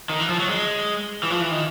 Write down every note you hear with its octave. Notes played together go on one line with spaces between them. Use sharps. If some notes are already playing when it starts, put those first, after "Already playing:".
D#3
E3
F3
F#3
G#3
E3
F3
E3
D#3